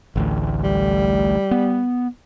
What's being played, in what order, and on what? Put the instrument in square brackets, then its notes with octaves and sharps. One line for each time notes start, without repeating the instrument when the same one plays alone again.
[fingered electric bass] A1 D2 A2
[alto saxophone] G3
[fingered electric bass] B3